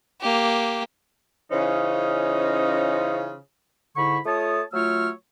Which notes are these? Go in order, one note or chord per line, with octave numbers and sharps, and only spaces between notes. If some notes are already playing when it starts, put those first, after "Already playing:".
A#3 G4
C#3 E3 C#4 D#4 F4 C5
G#2 D3 E4 B5 C#6
A3 F4 C#5 A5 D#6
F#3 A3 F4 C#5 E6 F6